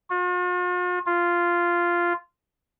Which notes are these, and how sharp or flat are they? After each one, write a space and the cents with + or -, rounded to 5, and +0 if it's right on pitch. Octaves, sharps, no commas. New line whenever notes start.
F4 +45
F4 -10